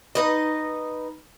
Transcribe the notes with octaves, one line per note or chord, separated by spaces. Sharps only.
D#4 B4 D#5